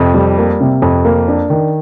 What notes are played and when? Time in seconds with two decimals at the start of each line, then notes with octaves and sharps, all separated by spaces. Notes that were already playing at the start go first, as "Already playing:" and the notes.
Already playing: F2 C3
0.14 G3
0.38 A#3
0.61 C3
0.82 F2
1.05 A#3
1.28 D4
1.50 D#3